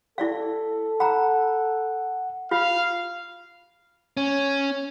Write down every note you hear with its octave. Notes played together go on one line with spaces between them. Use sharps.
E4 A4 D5 F5
F#5 A#5 B5
F4 F5
C#4